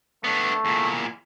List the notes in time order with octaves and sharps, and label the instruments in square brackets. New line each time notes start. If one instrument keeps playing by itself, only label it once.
[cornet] A3 [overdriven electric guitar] B3 D4
[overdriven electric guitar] E2 A#2